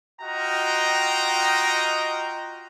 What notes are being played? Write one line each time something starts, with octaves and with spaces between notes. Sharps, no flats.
F4 F#4 D#5 G5 A#5